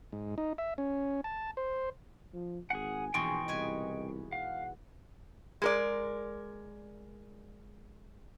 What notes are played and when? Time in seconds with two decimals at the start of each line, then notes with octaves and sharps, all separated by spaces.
0.12 G#2
0.38 D#4
0.58 E5
0.78 C#4
1.24 A5
1.57 C5
2.34 F3
2.70 G#1 G#4 F#5 G#5
3.14 A#1 E2 G#2 B2 G5 C6 C#6
3.48 C2 B4 C#5 D#5 G#5
4.32 F5 F#5
5.62 G#3 A#4 D5